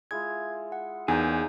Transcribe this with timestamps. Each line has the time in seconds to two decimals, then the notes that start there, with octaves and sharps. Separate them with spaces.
0.11 G#3 E4 F4 G#6
0.72 F#5
1.08 E2 D#3 F#3 A#3 D#4 G#4 G6